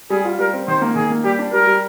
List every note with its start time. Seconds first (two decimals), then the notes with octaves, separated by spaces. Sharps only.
0.10 G3 G#4
0.25 F4
0.39 G3 A#4
0.53 C4
0.68 D#3 C5
0.82 A#3
0.96 D#3 G#4
1.10 A#3
1.24 G3 G4
1.39 D4
1.53 G3 A#4
1.67 G3